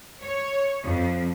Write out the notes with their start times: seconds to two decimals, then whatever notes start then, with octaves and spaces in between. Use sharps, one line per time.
0.22 C#5
0.84 F2